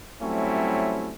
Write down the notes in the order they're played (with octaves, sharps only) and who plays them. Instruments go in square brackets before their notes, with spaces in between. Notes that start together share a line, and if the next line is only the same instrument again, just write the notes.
[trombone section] F#3 G3 A3 C4 C#4 E4